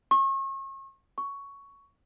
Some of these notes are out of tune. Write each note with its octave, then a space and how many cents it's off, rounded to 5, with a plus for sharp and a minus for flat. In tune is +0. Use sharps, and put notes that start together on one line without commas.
C#6 -35
C#6 +10